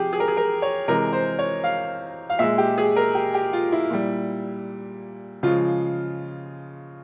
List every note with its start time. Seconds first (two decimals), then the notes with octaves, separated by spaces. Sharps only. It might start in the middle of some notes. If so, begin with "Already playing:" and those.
Already playing: C3 F3 G4 G#4
0.13 G#4
0.20 A#4
0.28 G#4
0.37 A#4
0.62 C#5
0.88 C3 E3 G#3 A#4
1.13 C5
1.39 C#5
1.64 F5
2.30 F5
2.39 A#2 G#3 E5
2.58 G4
2.78 G#4
2.96 A#4
3.15 G4
3.34 G4
3.53 F4
3.72 E4
3.91 A#2 G3
5.43 C#3 F3 G#3 F4